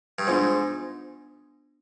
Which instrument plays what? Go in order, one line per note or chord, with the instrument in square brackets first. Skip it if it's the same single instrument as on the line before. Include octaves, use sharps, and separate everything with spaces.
[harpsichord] G2
[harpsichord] G#2 [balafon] B3 D4 F4 C5